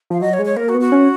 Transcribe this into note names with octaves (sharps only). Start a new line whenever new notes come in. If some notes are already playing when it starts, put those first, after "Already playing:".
F3 F5
F#3 D#5
C#5
G#3
C#5
A#3 A#4
F#4
B3
F#4
C#4